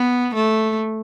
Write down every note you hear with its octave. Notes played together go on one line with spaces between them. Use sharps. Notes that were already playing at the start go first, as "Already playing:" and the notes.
Already playing: B3
A3